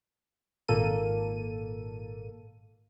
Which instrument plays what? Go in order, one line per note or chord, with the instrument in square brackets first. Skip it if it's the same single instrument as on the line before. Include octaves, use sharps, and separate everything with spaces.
[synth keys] G#1 A#2 A#3 A4 D#7